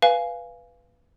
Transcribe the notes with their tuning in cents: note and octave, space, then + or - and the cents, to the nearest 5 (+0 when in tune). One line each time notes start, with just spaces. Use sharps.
B4 +0 F5 -15 G#5 +0